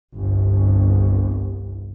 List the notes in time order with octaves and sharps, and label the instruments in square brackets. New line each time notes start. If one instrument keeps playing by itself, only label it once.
[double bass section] G1 C2